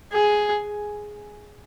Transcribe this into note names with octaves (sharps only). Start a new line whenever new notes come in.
G#4